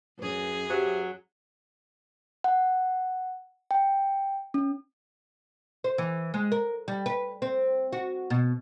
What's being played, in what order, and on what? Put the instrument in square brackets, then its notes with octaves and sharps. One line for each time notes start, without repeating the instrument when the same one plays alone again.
[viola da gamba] F#2 G#4 [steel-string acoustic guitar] B4 C#5
[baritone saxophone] F#3 [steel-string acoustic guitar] G4 C5 E5
[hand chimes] F#5
G5
C#4
[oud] C5
E3
G#3
A#4
G3
B4
C4
F#4
B2